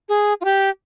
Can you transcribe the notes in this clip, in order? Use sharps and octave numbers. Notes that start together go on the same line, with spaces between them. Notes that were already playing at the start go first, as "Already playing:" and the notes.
G#4
F4
G4